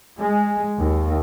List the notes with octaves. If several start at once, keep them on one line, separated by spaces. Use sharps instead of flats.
G#3
D#2